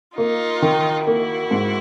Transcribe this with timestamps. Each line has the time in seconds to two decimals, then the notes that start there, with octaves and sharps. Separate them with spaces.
0.17 A#3 D#4 F4
0.62 D#3
1.06 A#3 E4 F#4
1.51 G#2